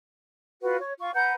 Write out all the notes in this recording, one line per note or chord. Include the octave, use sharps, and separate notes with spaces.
F4 F#4 B4
C#5
F4 C#6
B4 F#5 A#5 G6